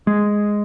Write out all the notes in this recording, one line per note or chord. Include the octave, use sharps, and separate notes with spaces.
G#3